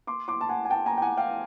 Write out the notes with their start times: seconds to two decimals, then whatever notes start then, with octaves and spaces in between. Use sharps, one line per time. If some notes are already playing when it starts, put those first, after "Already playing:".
0.07 C6 D6
0.28 C6 D6
0.41 A5
0.49 F#5 G#5
0.65 G#5
0.71 G5 A5
0.86 G#5 A#5
0.97 G5
1.02 F#5 G#5
1.17 F5 G5